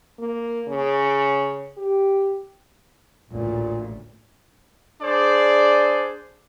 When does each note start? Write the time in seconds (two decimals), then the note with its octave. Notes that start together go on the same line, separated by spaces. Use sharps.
0.19 A#3
0.68 C#3
1.77 G4
3.30 A1 D2 A#2
5.01 D4 G#4 C5 D5